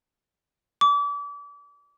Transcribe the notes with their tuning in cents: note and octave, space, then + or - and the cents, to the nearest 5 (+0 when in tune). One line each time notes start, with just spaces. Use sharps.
D6 -35